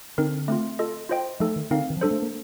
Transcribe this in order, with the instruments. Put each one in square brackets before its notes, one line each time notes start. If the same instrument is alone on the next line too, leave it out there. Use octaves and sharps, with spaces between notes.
[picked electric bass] D3 [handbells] C4 D#4 A#4
[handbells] A3 C4 F4
F4 A4 D#5
F4 C5 D#5 G5
[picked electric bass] F3 [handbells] A3 D#4 A4
[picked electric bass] D#3
[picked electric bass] D3 [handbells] C4 D#4 A#4 F5
[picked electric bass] D#3
F3
[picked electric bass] G3 [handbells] D4 A4 C5
[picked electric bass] A3
A#3